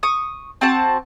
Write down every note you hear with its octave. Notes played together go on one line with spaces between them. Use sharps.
C#6 D#6
C4 F#4 A5